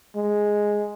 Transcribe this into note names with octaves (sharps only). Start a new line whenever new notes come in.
G#3